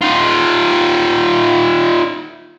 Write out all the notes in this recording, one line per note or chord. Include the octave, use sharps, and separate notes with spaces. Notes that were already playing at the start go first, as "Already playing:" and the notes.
D#4 F4